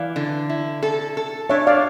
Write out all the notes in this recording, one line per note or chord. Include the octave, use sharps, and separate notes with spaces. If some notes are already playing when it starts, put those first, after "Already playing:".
Already playing: E3 D5 F5
D3
E4
A4
A4
D4 C#5 E5
D5 F5